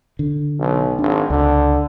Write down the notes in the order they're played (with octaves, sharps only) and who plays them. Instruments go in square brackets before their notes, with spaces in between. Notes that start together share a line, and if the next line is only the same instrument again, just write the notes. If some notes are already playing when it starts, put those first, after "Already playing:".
[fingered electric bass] D3
[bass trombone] B1
[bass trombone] G#1 [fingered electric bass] D4
[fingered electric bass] C#2 [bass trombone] D3